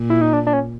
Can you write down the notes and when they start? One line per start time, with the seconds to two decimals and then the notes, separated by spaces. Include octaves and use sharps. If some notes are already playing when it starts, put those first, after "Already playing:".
Already playing: A#2
0.10 E4
0.21 D#4
0.33 D4
0.47 D4
0.53 C#4